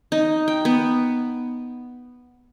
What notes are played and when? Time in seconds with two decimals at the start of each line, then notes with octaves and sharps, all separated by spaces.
0.12 D#4
0.48 G5
0.65 B3